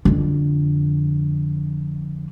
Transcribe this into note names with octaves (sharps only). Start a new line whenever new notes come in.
F2 D3